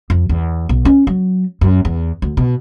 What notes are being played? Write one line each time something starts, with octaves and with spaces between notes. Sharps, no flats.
F2
E2
B1
C#4
F#3
F#2
E2
D2
B2